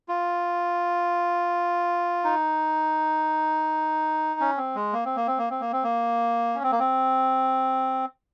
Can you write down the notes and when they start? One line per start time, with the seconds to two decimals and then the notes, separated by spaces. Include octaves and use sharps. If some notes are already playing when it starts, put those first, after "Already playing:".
0.09 F4
2.24 D#4
4.40 C#4
4.57 C4
4.75 G#3
4.93 A#3
5.05 C4
5.16 A#3
5.27 C4
5.38 A#3
5.50 C4
5.61 A#3
5.73 C4
5.84 A#3
6.55 C#4
6.63 C4
6.72 A#3
6.79 C4